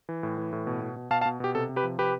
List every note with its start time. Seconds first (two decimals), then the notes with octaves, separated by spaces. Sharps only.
0.09 E3
0.23 A2
0.38 E3
0.53 A2
0.67 B2
0.82 B2
0.96 B2
1.10 B2 F5 A5
1.21 F5 A5
1.26 B2
1.40 B2 G4
1.55 C3 A4
1.69 C3
1.76 G4 B4
1.83 F3
1.98 C3 G4 B4